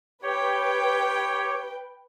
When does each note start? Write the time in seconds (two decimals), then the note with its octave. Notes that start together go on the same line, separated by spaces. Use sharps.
0.23 G4 B4 C#5 G5